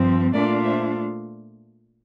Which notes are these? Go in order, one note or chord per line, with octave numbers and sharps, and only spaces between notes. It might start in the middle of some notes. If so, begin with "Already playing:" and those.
Already playing: G2 F3 C4
A#2 A3 D4 F4 A#4 D5
C5 E5